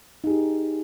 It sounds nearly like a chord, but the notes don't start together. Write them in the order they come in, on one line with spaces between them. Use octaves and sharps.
D#4 G#4 G4